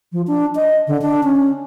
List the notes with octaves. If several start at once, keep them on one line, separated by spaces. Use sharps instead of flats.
F3
D4
D#5
D3
D4
C#4